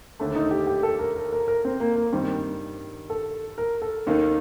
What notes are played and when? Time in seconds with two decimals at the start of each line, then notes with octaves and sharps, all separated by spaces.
0.20 D#2 D3 A3
0.35 D#4
0.51 G4
0.67 G4
0.83 A4
0.99 A#4
1.16 A#4
1.33 A#4
1.48 A#4
1.65 C4
1.80 A#3
1.96 A#3
2.13 G2 D#3 G3 C4
3.10 A4
3.58 A#4
3.82 A4
4.06 D#2 D#3 A#3 D#4